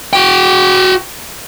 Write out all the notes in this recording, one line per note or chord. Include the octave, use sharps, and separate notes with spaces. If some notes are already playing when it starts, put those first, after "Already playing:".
F#4 G5